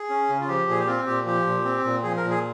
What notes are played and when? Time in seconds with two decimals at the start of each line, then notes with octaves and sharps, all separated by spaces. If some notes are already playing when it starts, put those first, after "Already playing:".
Already playing: G#4
0.09 C#4
0.30 C#3
0.41 F4
0.49 F3 G4
0.68 A#2 G#4
0.80 G4
0.87 C4 F4
1.06 A#2 G4
1.26 F3 G4
1.46 A#2
1.65 C4
1.84 A#2
2.03 F3 G#4
2.17 A#4
2.24 A#2
2.30 G#4